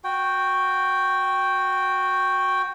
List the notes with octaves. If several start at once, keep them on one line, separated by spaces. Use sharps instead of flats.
F#4 G5